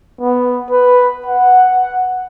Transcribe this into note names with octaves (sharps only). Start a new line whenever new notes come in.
B3
B4
F#5